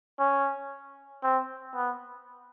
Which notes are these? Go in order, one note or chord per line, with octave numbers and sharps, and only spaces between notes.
C#4
C4
B3